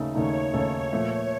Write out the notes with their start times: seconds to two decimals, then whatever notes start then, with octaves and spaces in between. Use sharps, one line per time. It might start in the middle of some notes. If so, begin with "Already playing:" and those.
Already playing: D#2 C#3 A3 D#4 A4
0.14 D#2 C#3 A3 D#4 A4 C#5
0.53 D#2 C#3 A3 D#4 A4
0.93 A#2 F3 A3